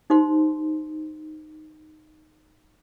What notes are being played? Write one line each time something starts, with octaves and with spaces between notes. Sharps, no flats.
D#4 G4 C5 C6